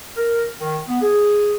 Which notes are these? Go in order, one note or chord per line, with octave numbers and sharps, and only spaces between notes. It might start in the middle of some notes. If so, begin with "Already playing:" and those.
A#4
D#3
B3
G#4